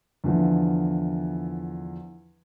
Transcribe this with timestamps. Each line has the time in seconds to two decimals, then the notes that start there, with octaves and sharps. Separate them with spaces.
0.24 E2 D3 E3 F3